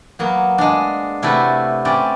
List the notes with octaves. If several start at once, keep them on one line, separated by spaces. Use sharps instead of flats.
F#3 A#3 B3
G#3 D4
C3 A3 E4 F#4 A4 B4
C4 C#4 B4 D5